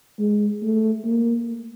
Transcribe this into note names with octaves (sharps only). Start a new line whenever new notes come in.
G#3
A3
A#3